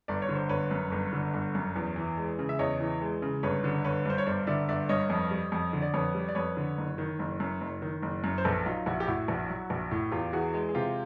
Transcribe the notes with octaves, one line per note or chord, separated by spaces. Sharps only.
G1 D5
C#5
D3
C5
G1 B4 C#5
F#2
G1
D3
G1
F#2
E2
E3
G#3
C#3
E5
E2 C#5 D#5
E3
G#3
C#3
G1 B4 C#5
D3
G1 B4 C#5
G2 C5
C#5
G1 C5 D5
D3 D5 E5
G1 D5 E5
G2 C#5 D#5
F2
G3
F2
D3
D5
F2 B4 C#5
G3
D5
F2 B4 C#5
D3
F#1
D#3
F#1
F#2
F#1
D#3
F#1
F#2
C5
A#1 A4 B4
F#3 D#4 F4
A#1 E4 F#4
G4
A2 E4 F#4
A#1
F#3
A#1
A2
E2 F4 G4
E3 F#4 G#4
G#3
G#4
C3 F4 G4